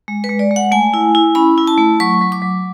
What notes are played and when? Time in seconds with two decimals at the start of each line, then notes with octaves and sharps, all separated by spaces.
0.08 G#3
0.24 B4
0.29 G#3
0.39 D5
0.51 G#3
0.56 F#5
0.72 A3 G#5
0.94 E4
1.15 E4
1.35 C#4 B5
1.58 E4
1.67 A5
1.78 A3
2.00 F#3 C#6
2.21 F#3
2.32 D6
2.42 F#3